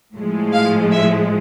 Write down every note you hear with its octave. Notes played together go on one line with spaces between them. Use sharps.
A2 F3 G#3
F5
E5